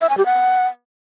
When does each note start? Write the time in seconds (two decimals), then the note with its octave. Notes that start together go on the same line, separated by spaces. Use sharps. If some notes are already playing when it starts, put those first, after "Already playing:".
0.01 E5
0.09 G#5
0.18 G4
0.26 F#5